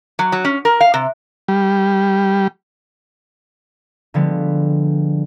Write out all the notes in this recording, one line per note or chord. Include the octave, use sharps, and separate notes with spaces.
F#3
F#3
C#4
A#4
F5
C3
G3
D3 F3 G3 G#3 B3